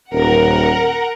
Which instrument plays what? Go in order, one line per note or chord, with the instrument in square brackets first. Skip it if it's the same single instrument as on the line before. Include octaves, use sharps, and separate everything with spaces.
[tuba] D#1 [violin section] A#4 F#5